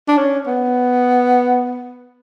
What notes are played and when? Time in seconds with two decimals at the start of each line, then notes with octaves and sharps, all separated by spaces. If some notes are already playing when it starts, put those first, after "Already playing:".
0.08 D4
0.18 C#4
0.47 B3